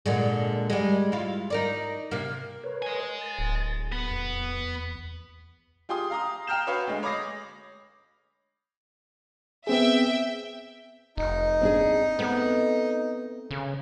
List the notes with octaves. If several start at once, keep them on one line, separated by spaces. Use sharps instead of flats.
A#2 D3 G#3
G3 G#3
E4 F4
D#4 A#4 D5
C3 A#3
A#4 B4 C#5
D#5 G#5
A6
D1
B3
E2
F4 G4 G#4 C6 D#6
F5 A#5 D#6
F5 G5 A#5 F6 G6 E7
F#4 B4 C#5 F5
D2 G#3
C#5 B5 D6 D#6 A#6 C7
B3 C4 G#4 E5 G5
F1 D#4
C4 D4 G#4
A3 B3 C4
C#3